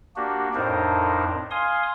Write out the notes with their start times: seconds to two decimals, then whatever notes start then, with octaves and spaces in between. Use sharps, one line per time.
0.16 A#3 D4 F#4 G4
0.55 F2 A2 D4 D#4 A#4 C5
1.51 F5 G#5 C6 D#6